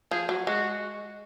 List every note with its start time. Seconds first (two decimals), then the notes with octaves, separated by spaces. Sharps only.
0.11 F3 G#4
0.29 F#3
0.47 G#3 F#4